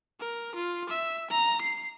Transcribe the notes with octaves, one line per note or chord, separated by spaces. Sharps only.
A#4
F4
E5
A#5
C7